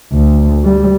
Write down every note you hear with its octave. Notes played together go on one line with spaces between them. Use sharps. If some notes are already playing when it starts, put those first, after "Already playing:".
D2
G3